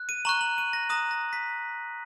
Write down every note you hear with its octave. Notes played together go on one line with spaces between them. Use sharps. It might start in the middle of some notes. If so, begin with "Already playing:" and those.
Already playing: F#6
D#7
A#5 C#6 F#6 F#7
F#7
D#7
A#6
A#5 D#6 F#6 A#6
A#6
B6